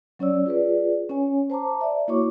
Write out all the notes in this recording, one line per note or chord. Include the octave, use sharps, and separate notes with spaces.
F#3 C#4 C#5 D5 E6
F4 G#4 B4 D5
C#4 C#5 G#5
C5 A5 A#5 D6
D5 E5
A#3 E4 F#4 C#5 C#6 D6